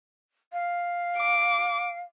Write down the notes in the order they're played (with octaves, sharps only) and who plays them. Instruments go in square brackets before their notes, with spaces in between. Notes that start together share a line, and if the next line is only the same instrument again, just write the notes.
[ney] F5
[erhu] D6